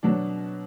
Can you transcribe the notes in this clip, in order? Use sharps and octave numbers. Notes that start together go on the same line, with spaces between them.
B2 F#3 B3 D4